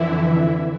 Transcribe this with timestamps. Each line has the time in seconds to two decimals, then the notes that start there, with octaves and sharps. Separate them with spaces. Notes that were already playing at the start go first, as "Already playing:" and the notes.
Already playing: F2 D3 E3 E4